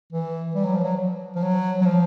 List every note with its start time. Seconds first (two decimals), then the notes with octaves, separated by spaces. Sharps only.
0.12 E3
0.55 G3
0.65 F#3
0.75 F3
0.84 F#3
1.35 F3
1.42 F#3
1.81 F#3
1.85 F3